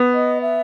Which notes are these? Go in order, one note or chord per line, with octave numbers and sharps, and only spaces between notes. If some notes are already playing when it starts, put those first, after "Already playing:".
Already playing: B3
D#5
E5